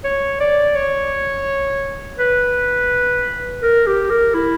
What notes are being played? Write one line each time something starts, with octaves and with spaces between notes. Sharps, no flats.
C#5
D5
C#5
B4
A#4
G4
A#4
E4